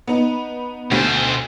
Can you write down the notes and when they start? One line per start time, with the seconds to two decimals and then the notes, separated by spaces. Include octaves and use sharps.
0.07 B3 D#4
0.92 D2 B2 C5